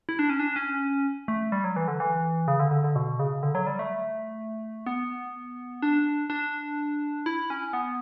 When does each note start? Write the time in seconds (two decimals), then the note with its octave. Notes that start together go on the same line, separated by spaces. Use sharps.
0.09 E4
0.19 D4
0.30 C#4
0.39 D4
0.56 C#4
1.28 A3
1.52 G3
1.64 F#3
1.76 E3
1.88 D3
2.00 E3
2.48 C#3
2.59 D3
2.71 D3
2.84 D3
2.96 B2
3.19 C#3
3.43 D3
3.55 F#3
3.67 G3
3.79 A3
4.86 B3
5.82 D4
6.30 D4
7.26 E4
7.50 C#4
7.73 B3